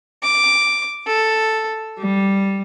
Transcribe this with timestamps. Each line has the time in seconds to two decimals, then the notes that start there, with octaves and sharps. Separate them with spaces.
0.22 D6
1.07 A4
2.00 G3